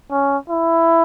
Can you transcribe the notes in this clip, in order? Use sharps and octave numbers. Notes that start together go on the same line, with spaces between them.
C#4
E4